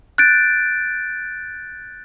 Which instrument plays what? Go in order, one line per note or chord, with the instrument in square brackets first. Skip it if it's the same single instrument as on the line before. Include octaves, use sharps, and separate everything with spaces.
[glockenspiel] F#6 G6 A6 D7